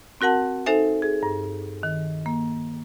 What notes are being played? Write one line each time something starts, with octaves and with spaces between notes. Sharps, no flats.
C4 F#4 A#4 F#5 A5
D#4 A4 C5 E5 G#5
G#4
G2
D#3
A#3